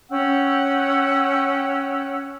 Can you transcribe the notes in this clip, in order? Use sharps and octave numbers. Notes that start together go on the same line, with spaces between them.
C#4 F#5 G5 E6